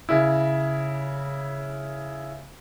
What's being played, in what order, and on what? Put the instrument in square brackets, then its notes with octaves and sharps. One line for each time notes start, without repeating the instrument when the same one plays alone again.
[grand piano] C#3 E4